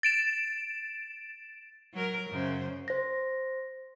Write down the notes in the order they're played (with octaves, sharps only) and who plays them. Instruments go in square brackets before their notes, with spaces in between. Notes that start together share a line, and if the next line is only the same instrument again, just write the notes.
[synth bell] A6 D7 E7
[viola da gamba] F#3 A#4
F#2 C#3 C5
[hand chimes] C5 A#6